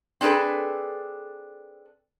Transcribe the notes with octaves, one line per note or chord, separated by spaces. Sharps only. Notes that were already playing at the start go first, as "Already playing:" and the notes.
C4 D4 G#4 A4 B4